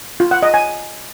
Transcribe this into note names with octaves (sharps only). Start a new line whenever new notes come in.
F4
F#5
D#5
G#5